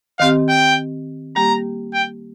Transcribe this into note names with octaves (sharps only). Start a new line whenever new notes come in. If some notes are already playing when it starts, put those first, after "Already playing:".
D#3 C4 G4 F5
G5
G3 A#3 G4 A#5
G5